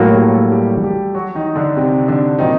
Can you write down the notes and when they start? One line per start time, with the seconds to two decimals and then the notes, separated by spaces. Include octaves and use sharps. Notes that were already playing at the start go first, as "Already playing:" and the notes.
Already playing: A2 F#3 A#3 F#4
0.10 G3 G4
0.31 A3 A4
0.52 G3 G4
0.84 G3 G4
1.14 F#3 F#4
1.35 D#3 D#4
1.55 D3 D4
1.76 C3 C4
2.08 D3 D4
2.39 A#2 D#3 F#3 C4 D#4